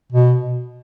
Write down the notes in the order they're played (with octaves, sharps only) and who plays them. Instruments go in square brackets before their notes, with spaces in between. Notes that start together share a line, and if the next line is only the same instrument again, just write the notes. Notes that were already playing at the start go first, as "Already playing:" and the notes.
[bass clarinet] B2